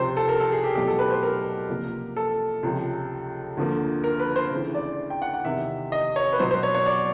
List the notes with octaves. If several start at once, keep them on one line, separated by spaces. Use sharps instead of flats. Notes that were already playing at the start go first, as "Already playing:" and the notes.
Already playing: C#2 C3 F3 C5
A4
A#4
A4
G#4
G4
E2 B2 F#3 A3 G4
A4
B4
C5
A#4
C#2 C3 F3 A#3
A4
C#2 C3 F3
D2 D3 F3 A#3
A#4
B4
C5
D2 C#3 E3
D5
G5
F#5
F#5
E2 C3 D#3 E5
D#5
C#5
B4
B2 F#3 B3 C5
C5
C#5
C#5
D5